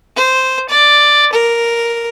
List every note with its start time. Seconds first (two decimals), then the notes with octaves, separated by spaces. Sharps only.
0.16 C5
0.69 D5
1.33 A#4